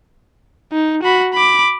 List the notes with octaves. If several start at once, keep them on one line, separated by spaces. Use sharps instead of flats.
D#4
F#4 B5
B5 D6